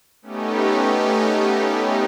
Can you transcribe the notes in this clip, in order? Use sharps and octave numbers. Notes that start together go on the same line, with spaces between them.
A3 B3 C#4 D#4 G4